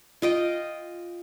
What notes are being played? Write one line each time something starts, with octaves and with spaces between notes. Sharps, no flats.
F4 D#5 G5